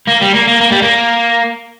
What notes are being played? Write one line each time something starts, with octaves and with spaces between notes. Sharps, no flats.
A#3
G3
A#3
A#3
A#3
G3
A#3